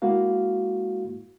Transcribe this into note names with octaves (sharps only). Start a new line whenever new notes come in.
G#3 A#3 E4 F#4 F5